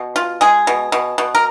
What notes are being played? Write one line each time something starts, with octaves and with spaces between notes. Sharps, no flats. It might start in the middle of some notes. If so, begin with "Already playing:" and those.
Already playing: B2
F4
G#3 G#4
B2
B2
B2
A#4